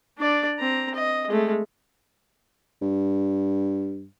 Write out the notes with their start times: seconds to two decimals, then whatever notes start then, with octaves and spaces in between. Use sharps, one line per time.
0.18 D4 D5
0.59 C4 A#5
0.95 D#5
1.28 G#3 A3
2.82 G2